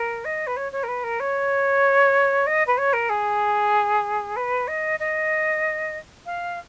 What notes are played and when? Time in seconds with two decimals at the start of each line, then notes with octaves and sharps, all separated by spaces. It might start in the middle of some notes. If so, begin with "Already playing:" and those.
Already playing: A#4
0.25 D#5
0.47 B4
0.56 C#5
0.72 C#5
0.83 A#4
0.88 B4
1.04 A#4
1.20 C#5
2.46 D#5
2.67 B4
2.78 C#5
2.93 A#4
3.09 G#4
4.36 B4
4.67 D#5
4.99 D#5
6.26 F5